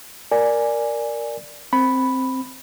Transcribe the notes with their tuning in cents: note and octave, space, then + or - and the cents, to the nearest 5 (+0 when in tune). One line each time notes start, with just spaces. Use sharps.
A#4 +0 D5 +0 G#5 +0
C4 +0 B5 +0